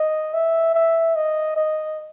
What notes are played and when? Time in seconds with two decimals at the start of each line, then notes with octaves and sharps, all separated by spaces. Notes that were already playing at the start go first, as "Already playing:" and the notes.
Already playing: D#5
0.34 E5
0.74 E5
1.15 D#5
1.56 D#5